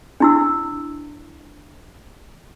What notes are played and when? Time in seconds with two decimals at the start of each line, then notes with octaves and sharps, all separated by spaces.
0.20 D4 E4 E6